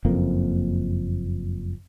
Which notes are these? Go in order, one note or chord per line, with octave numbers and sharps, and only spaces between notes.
F#1 F2 A#3 C4